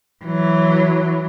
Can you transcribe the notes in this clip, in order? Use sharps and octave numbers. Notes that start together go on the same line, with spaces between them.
E3 F#3